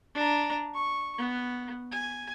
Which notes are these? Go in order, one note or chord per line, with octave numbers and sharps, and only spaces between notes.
D4 A#5
C#6
B3
G#5